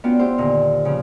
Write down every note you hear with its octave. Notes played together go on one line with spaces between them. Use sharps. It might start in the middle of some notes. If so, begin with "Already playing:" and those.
B3 C#4 D4 F4 F#4 G5
B3 D4 E4 G4 C5
D#2 A#2 D3
C#3 F3